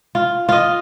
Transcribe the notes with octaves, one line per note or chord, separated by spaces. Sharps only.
F4
F4 D#5